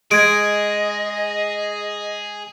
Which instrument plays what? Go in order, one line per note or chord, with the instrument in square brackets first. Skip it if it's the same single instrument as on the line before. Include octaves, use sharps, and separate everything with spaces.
[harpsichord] G#3 [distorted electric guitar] G#4 [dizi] D#5 [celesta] G#6 D7